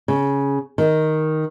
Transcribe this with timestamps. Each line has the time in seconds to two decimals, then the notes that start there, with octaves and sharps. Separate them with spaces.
0.08 C#3
0.78 D#3